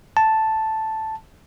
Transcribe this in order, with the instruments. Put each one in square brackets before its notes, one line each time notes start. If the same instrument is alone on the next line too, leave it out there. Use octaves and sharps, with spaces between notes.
[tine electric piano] A5